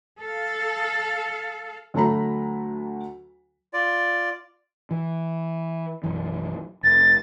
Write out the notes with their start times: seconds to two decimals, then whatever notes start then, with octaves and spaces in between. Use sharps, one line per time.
0.19 A4 F5
1.94 D2 F#3 A3 A#5 B5
3.73 F4 D5
4.91 E3
6.04 B1 F#2 E3
6.83 F1 A6